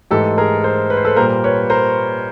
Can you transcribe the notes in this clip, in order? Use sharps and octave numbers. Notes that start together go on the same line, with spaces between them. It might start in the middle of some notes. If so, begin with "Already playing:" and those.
G#2 E3 A3 G4 A4
G#4 A#4
A#4 C5
B4
C5
A4 B4
A#2 G3 A#4 C5
B4 C#5
A#4 C5